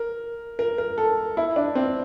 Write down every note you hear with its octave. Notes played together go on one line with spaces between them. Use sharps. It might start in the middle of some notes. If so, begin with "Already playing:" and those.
Already playing: A#4
A#4
A#4
A4
E4
D4
C4